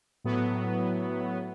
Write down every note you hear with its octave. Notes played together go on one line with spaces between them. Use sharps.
A2 F#3 B3